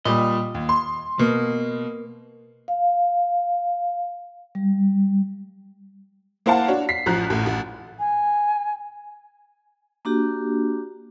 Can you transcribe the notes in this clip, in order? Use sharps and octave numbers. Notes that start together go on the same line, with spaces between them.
A#2 G3 D#5
D#2
C6
B2 A#3
F5
G3
A#3 E4 C5 F5 F#5 A5
D4 F#4 C#5
B6 C7
A1 F3 A#5 F#6
A1 A2
A1
G#5
A#3 D4 F#4 G4